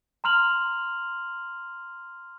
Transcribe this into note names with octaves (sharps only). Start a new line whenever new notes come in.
A#5 C6 F6 F7 F#7